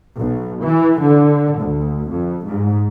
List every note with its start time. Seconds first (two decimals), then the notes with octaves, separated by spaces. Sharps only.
0.18 B1
0.64 E3
1.02 D3
1.60 D2
2.09 F2
2.46 G#2